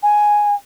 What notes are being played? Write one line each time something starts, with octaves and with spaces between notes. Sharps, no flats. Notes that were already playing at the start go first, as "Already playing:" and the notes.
G#5